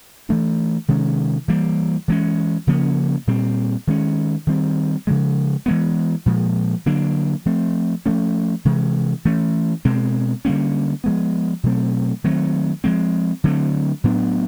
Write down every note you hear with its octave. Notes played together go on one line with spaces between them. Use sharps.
E3 A3 D4
C3 D#3 G#3 C#4
E3 G3 A#3
E3 G#3 C#4
C#3 F3 A#3 C#4
A#2 G3 C4
D#3 G#3 C#4
D#3 G3 C4
C#3 F3 G#3
E3 G#3 B3
A#2 F3 G#3
D3 F#3 A#3 D4
F3 A3 C4
F3 A3 C#4
C3 E3 G#3
E3 A3 C#4
B2 G#3 C4
D3 G3 A#3 C#4
F3 G#3 B3
B2 F#3 A3 C4
D#3 F#3 A3 C4
F3 G#3 C4
D3 F#3 A3 C4
A2 F#3 B3 D4